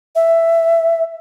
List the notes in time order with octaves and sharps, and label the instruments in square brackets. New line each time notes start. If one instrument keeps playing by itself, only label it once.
[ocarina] E5